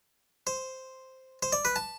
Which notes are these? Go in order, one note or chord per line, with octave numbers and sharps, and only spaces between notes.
C5
C5
D5
B4
A5